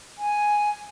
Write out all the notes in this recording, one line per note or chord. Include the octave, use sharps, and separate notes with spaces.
G#5